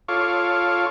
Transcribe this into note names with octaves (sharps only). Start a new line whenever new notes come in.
F4 A4 C#5 F5 C#6 D6